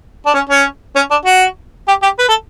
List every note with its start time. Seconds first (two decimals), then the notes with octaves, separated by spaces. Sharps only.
0.26 D4
0.34 C#4
0.49 C#4
0.96 C#4
1.11 D4
1.26 F#4
1.88 G4
2.02 G4
2.19 B4
2.28 A4